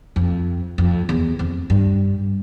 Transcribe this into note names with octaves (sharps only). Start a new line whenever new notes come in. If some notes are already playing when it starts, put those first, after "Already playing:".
F2
F2
E2
F2
G2